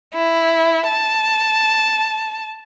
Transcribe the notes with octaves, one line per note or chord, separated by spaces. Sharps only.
E4
A5